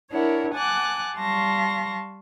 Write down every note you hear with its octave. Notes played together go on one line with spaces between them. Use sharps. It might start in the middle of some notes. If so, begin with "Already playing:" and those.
D4 E4 A#4 C#5 F#5
F#5 G#5 A5 D6 F#6
G3 F5 A5 C6 C#6 A#6